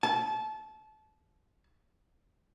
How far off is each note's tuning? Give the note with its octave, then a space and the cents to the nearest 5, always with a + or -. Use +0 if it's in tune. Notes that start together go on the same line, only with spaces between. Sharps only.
A5 -25